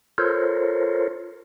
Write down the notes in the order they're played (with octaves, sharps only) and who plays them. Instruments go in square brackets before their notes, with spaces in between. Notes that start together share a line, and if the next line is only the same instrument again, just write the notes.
[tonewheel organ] F4 A4 A#4 C5 C#5